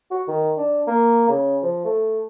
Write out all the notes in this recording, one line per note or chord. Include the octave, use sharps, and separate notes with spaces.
F#4
D#3
D4
A#3
C#3
F3
A3